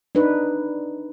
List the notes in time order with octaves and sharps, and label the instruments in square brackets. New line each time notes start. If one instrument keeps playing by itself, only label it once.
[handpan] D4 D#4 B4